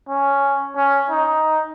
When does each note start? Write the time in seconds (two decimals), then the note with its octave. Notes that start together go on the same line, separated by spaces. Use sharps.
0.09 C#4
0.76 C#4
1.10 D#4